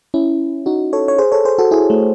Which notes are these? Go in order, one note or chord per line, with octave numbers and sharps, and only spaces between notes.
C#4 E4
D#4 F#4
A4 C#5
C#5
G#4 C5
A4 C#5
G#4 C5
F#4 A4
E4 G#4
A3